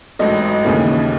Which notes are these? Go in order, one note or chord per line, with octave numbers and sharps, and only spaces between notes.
A1 G#2 F#3 A3 D#5
D#2 C#3 E3 A3